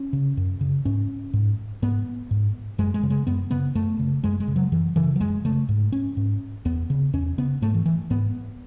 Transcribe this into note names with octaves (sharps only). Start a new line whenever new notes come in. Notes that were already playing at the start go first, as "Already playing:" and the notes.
Already playing: C#4
C#3
F#2
C#3
G#2 C#4
G#2
G#2 B3
G#2
F#2 G#3
G#3
C#3
G#3
F#2 B3
C#3 B3
F#2 A3
C#3
F#2 G#3
G#3
C#3
F#3
F#2 E3
C#3 E3
F#3
F#2 G#3
C#3 A3
G#2
C#4
G#2
E2 B3
C#3
E2 C#4
C#3 B3
G#2 A3
E3
E3
G#2 B3